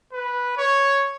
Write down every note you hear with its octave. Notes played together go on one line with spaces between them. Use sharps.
B4
C#5